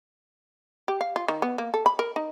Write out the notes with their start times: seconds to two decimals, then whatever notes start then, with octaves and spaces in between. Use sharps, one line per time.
0.88 G4
1.01 F5
1.16 F4
1.28 D#3
1.42 B3
1.58 A#3
1.74 A4
1.86 B5
1.99 A#4
2.16 D#4